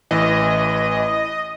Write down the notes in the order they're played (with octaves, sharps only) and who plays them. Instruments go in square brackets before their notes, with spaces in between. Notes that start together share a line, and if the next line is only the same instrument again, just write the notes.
[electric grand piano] A1 E3 [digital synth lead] D#5